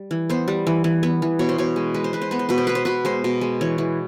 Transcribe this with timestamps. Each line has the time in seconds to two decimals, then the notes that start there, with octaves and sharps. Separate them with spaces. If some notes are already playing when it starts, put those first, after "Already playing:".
Already playing: G3
0.11 E3
0.30 B3 C5
0.48 G3
0.67 E3
0.84 E3
1.03 B3
1.22 E3
1.39 B2 C#5
1.49 C5
1.58 B2 C#5
1.76 G#3
1.94 G#3 B4
2.04 C5
2.13 G#3 B4
2.22 C5
2.31 B3 B4
2.39 C5
2.49 B2 B4
2.58 C5
2.67 B3 B4
2.75 C5
2.85 B2 B4
3.05 G#3 C5
3.24 B2
3.41 G#3
3.61 E3 C#5
3.78 E3